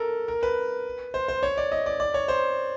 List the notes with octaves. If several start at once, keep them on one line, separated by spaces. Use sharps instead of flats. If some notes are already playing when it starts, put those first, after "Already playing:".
Already playing: A4 A#4
A#4
B4
C5
C5
C#5
D5
D#5
D5
D5
C#5
C5